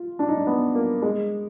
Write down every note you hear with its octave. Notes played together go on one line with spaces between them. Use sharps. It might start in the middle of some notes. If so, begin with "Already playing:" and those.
Already playing: F4
D4
D#4
D4
B3
A#3
G#3